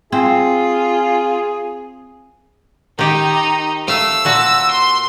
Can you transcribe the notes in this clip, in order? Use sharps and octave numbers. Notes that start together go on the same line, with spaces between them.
C4 F4 G#4
D#3 D#4 G4
A3 F5 E6
A#2 F#4 A5
C6